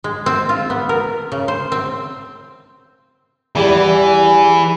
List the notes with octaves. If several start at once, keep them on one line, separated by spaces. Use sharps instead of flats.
G#3
C4
F4
B3
A#4
C#3
C5
C4
E2 E3 G3
G#5